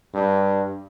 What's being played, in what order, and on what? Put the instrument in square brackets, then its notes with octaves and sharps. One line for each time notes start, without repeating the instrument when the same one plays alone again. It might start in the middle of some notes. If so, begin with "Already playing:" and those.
[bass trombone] G2